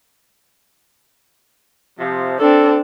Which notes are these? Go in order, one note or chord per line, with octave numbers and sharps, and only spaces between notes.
C3 F3
C4 D4 A4